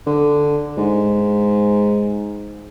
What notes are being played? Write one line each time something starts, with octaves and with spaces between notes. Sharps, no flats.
D3
G#2